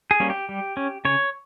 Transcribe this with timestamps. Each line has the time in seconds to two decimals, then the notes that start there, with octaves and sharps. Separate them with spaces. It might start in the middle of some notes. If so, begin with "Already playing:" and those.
0.11 G#4
0.20 G3 A#3 C#4
0.30 G4
0.49 G3
0.77 C#4
1.05 C#3 C#5